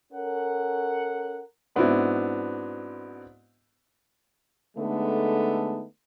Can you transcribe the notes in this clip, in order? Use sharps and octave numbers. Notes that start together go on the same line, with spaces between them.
C#4 A4 A#4 F#5
G#2 B3 C4 D4 E4 F#4
D3 G#3 A3 B3 D#4 A4